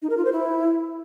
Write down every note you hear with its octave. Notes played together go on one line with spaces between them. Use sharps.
D#4
A#4
F4
C5
E4